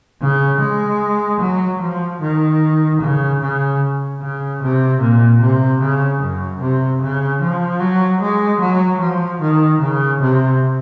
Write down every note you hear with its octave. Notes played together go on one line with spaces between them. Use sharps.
C#3
G#3
F#3
F3
D#3
C#3
C#3
C#3
C3
A#2
C3
C#3
F#2
C3
C#3
F3
F#3
G#3
F#3
F3
D#3
C#3
C3